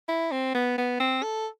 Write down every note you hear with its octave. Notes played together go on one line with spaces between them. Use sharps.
E4
C4
B3
B3
C4
A4